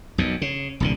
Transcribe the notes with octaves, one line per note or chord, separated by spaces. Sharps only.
B1 F#2 B2
C#3
D#1 C2 D3